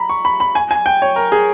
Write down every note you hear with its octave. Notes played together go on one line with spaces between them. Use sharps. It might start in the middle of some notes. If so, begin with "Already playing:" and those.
Already playing: A#5 B5
C#6
B5
B5
G#5
G#5
G5
C#5
A#4
G#4